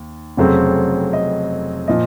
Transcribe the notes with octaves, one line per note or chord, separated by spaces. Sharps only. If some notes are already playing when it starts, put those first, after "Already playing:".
Already playing: D#2
F1 F2 C#3 F#3 C4
D#5
A#2 F3 D#5